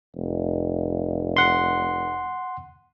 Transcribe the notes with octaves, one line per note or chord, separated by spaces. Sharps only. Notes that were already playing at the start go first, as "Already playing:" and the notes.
F1
F#5 C6